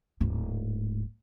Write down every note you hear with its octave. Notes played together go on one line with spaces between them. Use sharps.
D1 G#2